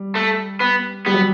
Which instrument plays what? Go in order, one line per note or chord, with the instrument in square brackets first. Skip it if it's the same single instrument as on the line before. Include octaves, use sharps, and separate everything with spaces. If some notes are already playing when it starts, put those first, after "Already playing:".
Already playing: [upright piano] G3
[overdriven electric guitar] A3
B3
[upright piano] G3 [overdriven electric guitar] B3
[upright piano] F#3